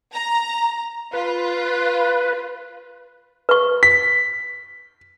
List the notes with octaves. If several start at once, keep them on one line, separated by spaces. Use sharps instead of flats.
A#5
F4 B4
B4 C#6
B6